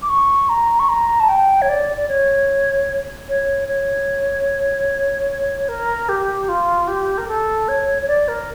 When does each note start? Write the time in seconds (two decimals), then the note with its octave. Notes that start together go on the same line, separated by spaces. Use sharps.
0.02 D6
0.09 C#6
0.49 A#5
0.79 C#6
0.89 A#5
1.20 A5
1.28 G5
1.62 C#5
1.69 D5
1.97 D5
2.09 C#5
3.29 C#5
3.68 C#5
5.69 A#4
6.09 G4
6.49 F4
6.88 G4
7.18 A#4
7.28 A4
7.68 C#5
8.02 C#5
8.08 D5
8.28 A#4